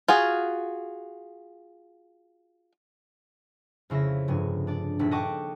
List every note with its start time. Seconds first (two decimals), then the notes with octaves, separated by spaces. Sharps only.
0.08 F4 F#4 G#4
3.90 F2 C#3 E4 E5 A#6
4.28 F1 G2 G#4
4.67 D4 D5
4.99 D#1 D4 A4 B6
5.11 D#5 F#5 G5 A5 C#6 D6